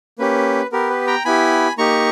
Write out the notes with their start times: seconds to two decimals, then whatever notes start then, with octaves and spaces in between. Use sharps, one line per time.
0.19 A#3 C#4 G4 B4
0.72 B3 G4 A#4
0.90 B4
1.07 G5 A#5
1.25 B3 E4 G4 G#5 B5
1.78 A#3 D#4 G4 A#5 C#6